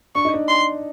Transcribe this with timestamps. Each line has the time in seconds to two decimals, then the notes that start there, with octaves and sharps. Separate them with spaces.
0.15 D4 C#6
0.25 D#4
0.34 D4
0.48 C6